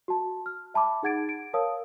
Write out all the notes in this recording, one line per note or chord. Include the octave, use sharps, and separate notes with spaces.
F#4 A5
F6
E5 A5 B5 D6
D#4 G#4 F#5 G#6 A6 D7
D7
A#4 C#5 F5 A5 D#6 E6